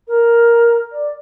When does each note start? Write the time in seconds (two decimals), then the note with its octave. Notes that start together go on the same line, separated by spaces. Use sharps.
0.08 A#4
0.92 D5